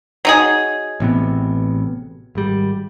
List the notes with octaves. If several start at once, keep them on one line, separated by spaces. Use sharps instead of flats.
F#3 D#4 G#4
A1 C3 B3
G#1 G3